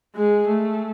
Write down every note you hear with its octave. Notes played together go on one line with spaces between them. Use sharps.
G#3 G#4
A3